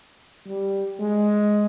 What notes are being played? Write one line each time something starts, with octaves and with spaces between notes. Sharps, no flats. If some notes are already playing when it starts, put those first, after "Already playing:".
G3
G#3